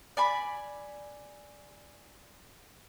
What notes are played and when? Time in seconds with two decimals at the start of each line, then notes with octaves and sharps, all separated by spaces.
0.17 D5 G#5 B5